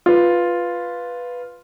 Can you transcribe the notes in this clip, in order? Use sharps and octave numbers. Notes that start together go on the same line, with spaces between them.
F4 B4